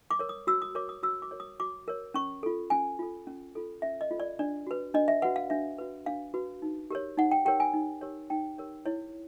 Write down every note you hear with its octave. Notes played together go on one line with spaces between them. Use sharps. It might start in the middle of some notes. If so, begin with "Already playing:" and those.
D6
A#4 C#5
D#6
F#4 E6
D#6
A#4 C#5 D6
D#6
F#4 E6
D6
A#4 C#5
D#6
F#4 D6
A#4 C#5
C#4 C#6
F4 A4
C#4 G#5
F4 A4
C#4
F4 A4
C#4 E5
D#5
F4 A4
D5
D4 D5
F#4 B4
D4 D#5
E5
F#4 B4 F#5
F5
D4 E5
F#4 B4
D4 F5
F#4 B4
D#4
G4 A#4 C#5
D#4 F#5
G5
G4 A#4 C#5 G5
G#5
D#4
G4 A#4 C#5
D#4 G5
G4 A#4 C#5
E4 C#5